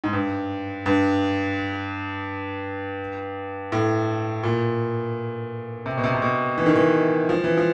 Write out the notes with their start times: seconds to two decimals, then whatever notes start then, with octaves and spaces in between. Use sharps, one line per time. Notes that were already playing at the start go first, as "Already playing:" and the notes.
0.04 G#2
0.13 G2
0.86 G2
3.72 A2
4.43 A#2
5.86 C3
5.97 B2
6.04 C3
6.15 C3
6.22 B2
6.58 E3
6.66 D#3
6.76 E3
7.29 F3
7.44 E3
7.57 F3